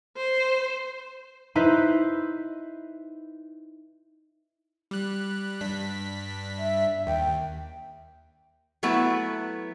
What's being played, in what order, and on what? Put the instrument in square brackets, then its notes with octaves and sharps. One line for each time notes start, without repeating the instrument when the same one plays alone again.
[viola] C5
[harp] D#4 E4 B4 C5
[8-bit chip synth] G3 F#6
G2 D4 B6
[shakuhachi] E5
[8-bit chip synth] D#2 [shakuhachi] G5
[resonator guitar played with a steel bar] F#3 A3 B3 E4 B4